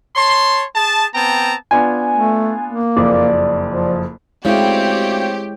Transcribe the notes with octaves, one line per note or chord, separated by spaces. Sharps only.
C#5 A5 C6
G#4 A5
B3 C4 G5 A5 A#5
B3 D4 F4 G#5
A3
A#3
F#1 F2 D5
F3
D2 C#3 G#3 C4 E4 G4 C#5